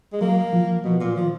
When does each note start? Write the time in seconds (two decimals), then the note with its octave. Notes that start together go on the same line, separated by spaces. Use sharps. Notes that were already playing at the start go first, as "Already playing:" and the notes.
0.13 G#3
0.21 F#3 A#3
0.53 F3
0.84 B2 F3
1.00 A#2
1.16 D#3 F3